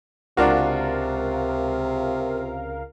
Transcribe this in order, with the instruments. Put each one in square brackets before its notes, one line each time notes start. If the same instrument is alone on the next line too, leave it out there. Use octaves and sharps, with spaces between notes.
[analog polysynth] C#2 A#4 F5 [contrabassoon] C3 [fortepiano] D4 F4 F#4